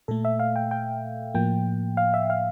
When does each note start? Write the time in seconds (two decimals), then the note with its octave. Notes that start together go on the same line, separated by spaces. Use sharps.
0.08 A#2 A3 A4
0.25 E5
0.39 F5
0.56 G5
0.71 G5
1.34 A2 F3 A#3 G5
1.97 F5
2.14 E5
2.30 F5